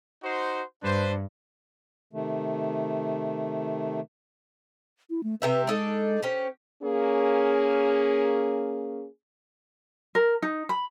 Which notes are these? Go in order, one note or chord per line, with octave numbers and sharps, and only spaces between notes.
D#4 F#4 C5
G2 D4 B4 C5
C3 D#3 A3
E4
A3
C3 G4 B4 E5
G#3 D4 D#4 A4
C#4 G4 C5
A#3 C#4 G#4
A#4
D#4
B5